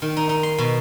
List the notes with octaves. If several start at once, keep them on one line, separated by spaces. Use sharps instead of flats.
D#3
D#4
D#4
C6
B2